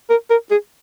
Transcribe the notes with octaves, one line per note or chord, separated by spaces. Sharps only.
A#4
A#4
G#4